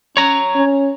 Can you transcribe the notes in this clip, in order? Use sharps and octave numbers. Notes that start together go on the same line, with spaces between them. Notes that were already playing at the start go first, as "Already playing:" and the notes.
C#4 C#5 A#5
C#4